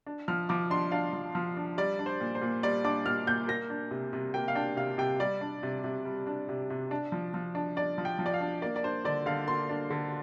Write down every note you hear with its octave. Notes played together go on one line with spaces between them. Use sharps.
D4
F3 F6
F3 D6
D4 C6
D4 F5
F3
F3
D4
G3 D5
D4
C5
A#2
C5
A#2
G3 D5
D4 D6
A#2 F6
A#2 G6
A#3 A#6
D4
C3
C3
A#3 G5
F5
D4 G5
C3 F5
C3 G5
G3 D5
D4
C3
C3
G3
D4
C3
C3
D4
F3
F3
D4
D4 D5
F3
G5
F3
D5
F5
D4
A#3 D5
D5
D4 C5
D3 D5
D3 F5
A#3 C6
D4
D3